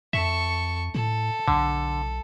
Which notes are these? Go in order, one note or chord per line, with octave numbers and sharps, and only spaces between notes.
F2 A4 E5 C#6
A2 A4
B1 D3